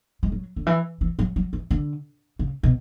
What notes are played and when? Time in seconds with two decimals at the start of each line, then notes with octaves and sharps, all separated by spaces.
0.23 G#3
0.32 F#3
0.56 D3
0.66 E3
1.01 E3
1.19 F#3
1.36 F#3
1.53 E3
1.71 D3
2.39 C#3
2.63 B2